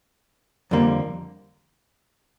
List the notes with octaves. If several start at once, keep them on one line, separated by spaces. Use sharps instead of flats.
F2 D3 G3 A#3